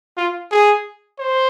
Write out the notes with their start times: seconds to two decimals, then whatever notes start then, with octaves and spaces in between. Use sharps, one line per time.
0.17 F4
0.52 G#4
1.19 C5